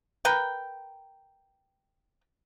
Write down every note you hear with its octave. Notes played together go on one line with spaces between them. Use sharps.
A#4 B4 G5